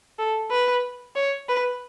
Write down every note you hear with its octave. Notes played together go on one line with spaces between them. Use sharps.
A4
B4
C#5
B4